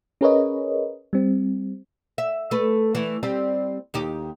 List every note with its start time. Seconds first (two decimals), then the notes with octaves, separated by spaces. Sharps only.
0.21 C#4 G#4 A#4 B4 C#5 D#5
1.13 G3 C4
2.18 E5
2.51 A3 B4
2.95 E3 A3
3.23 G3 C4 G4
3.94 D#2 D#4 G4